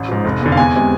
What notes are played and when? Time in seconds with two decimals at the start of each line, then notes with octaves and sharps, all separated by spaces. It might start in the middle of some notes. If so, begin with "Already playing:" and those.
Already playing: A1
0.08 G#2 F3
0.25 F1
0.41 E2 D3
0.52 F5
0.57 E2 G#5
0.75 C3 G#3